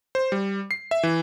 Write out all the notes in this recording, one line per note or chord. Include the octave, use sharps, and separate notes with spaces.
C5
G3
C7
E5
E3